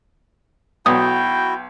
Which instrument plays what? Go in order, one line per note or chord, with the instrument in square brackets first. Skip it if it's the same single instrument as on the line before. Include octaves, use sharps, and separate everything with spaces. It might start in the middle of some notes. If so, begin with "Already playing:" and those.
[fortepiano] B1 [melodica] E4 F#4 [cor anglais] G5 [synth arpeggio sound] D#6